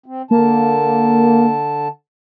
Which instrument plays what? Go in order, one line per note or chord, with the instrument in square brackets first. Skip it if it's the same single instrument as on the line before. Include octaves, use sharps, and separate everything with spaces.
[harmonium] C4
[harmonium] D3 A5 [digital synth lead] A#3